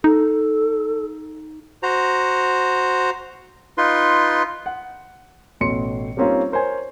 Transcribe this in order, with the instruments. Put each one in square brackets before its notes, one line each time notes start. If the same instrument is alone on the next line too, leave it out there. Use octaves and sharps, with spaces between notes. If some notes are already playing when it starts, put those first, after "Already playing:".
[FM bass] D#4 [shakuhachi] A4
[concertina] F#4 C5 A#5
D#4 F4 B4 C6
[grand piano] F#5
A1 B2 A3 C#5 C6 C#7
G3 A#3 C4 C#4 D#4 F4
A#4 C5 C#5 G#5